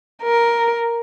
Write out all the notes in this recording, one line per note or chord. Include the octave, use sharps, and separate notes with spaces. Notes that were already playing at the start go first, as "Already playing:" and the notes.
A#4